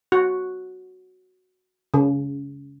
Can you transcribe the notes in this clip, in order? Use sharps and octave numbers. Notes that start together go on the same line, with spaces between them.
F#4
C#3